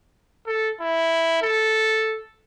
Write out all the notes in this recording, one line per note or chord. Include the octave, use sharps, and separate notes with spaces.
A4
E4
A4